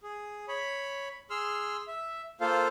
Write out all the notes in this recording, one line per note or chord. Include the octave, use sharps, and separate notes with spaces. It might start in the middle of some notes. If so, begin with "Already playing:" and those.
G#4
C#5 B5
G#4 C6 E6 F6
E5
A#3 F4 A4 C5 F5